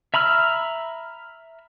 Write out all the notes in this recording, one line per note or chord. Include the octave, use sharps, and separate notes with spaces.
E5 A#5 B5 E6 F6